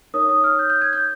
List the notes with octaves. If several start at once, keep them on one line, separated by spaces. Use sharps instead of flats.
D#4 A#4 C#5 D#6
D#6
F6
G6
G6
G#6
G6